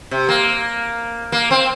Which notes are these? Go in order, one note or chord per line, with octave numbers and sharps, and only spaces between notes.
C3
A#3
A#3
C4